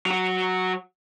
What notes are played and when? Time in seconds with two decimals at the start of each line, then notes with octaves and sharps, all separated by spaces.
0.06 F#3 F#4